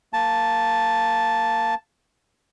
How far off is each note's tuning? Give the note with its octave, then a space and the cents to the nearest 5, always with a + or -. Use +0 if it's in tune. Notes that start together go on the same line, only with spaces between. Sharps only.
A#3 -10 A5 +0